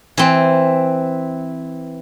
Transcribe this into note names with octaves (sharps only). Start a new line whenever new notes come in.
E3 C4